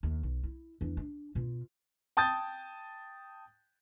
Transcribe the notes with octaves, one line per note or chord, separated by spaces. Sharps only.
D#2
B1
E4
E2 D4
D4
B2 F4
G5 A5 D#6 G6 A6